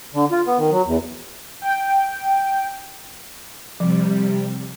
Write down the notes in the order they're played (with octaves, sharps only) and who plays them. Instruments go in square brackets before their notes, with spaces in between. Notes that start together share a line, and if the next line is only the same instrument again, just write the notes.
[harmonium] D3
F4
B3
D#3
F#3
E2
[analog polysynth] G5
[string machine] C3 G3 [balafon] F3